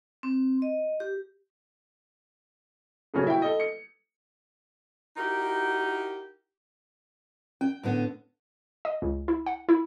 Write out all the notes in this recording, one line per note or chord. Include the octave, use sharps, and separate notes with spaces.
C4
D#5
G4
D#1 C#3 F#3 A3 C#4
E4 F#4 G5
A4 D#5
C#7
D#4 E4 F#4 G4 A#4
C#4 G5
A2 D3 B3
D#5
C#2
E4
F#5
E4